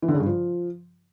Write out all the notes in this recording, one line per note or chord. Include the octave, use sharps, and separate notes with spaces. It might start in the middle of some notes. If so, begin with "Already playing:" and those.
E3
D3
C#3
G2
F3